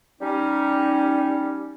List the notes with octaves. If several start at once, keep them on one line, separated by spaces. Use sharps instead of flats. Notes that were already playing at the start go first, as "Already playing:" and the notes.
G3 C#4 D#4